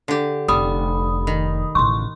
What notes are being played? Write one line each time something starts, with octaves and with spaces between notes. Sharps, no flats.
D3 G4
F1 G3 B5 D#6
D#3
A1 C#3 C6 C#6